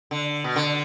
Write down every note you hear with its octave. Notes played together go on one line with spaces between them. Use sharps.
D3
B2
D3